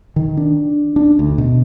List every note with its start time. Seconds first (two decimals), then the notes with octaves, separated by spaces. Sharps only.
0.16 D#3
0.37 D4
0.96 D4
1.19 D2
1.38 B2